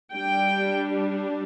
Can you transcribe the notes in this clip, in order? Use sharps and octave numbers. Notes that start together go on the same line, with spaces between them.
G3 D4 G5